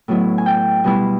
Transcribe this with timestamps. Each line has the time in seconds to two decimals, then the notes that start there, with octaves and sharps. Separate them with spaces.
0.08 A2 F#3 B3 E4
0.38 G#5
0.46 G5
0.84 B2 G3 B3 E4